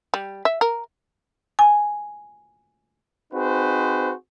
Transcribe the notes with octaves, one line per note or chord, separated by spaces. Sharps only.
G3
E5
A#4
G#5
C4 D#4 F#4 G#4 B4 C5